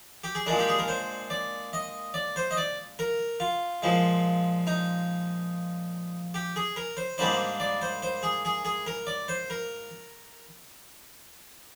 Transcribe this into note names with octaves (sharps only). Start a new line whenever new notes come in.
G4
G#4
A#2 G#3 D4 A#4
G4
G#4
A#4
C5
D5
D#5
D5
C5
D#5
D5
A#4
F4
A#2 F3 G#3
D#4
G4
G#4
A#4
C5
G#2 G3 A#3 D4 C5
D5
C5
C5
G#4
G#4
G#4
A#4
D5
C5
A#4